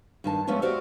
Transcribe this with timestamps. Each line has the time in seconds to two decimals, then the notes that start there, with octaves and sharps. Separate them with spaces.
0.24 G2 D#3 A5
0.47 F3 G#3 A3 B3 C#4 F4
0.62 F#4 G4 C5 D5 E5 F5